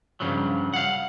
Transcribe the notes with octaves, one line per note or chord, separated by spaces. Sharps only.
G2 C#3 F3 F#3
F5 F#5